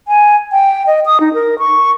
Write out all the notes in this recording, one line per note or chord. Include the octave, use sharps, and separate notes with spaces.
G#5
G5
D#5
D#6
D#4
A#4
C#6